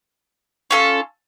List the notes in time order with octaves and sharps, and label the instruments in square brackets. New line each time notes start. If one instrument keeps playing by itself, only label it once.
[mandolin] C#4 F4 A4